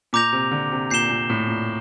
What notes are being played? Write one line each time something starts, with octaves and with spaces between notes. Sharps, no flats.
A#2 A#5 D6 G6 A#6 F7
C3
D3
C3
A#2 G6 C7 E7 G7
A#2
A2
A#2